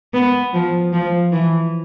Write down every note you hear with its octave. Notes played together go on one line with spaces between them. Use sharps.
B3
F3
F3
E3